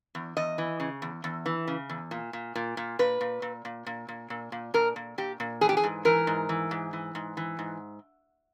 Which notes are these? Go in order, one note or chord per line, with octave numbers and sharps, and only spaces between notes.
E2
E2 D#5
E3
C#3
E2
E2
E3
C#3
E2
A#2
A#2
A#2
A#2
A#2 B4
A#2
A#2
A#2
A#2
A#2
A#2
A#2
A#2 A#4
A#2
A#2 G4
A#2
E3 G#4
G4
G#4
G#2
E3 A#4
G#2
E3
G#2
E3
G#2
E3
G#2